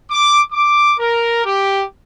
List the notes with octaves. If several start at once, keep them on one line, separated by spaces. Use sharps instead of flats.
D6
D6
A#4
G4